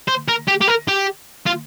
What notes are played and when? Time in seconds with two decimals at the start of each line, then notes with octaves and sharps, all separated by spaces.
0.08 C5
0.29 A#4
0.48 G4
0.61 G4
0.68 A#4
0.88 G4
1.46 F4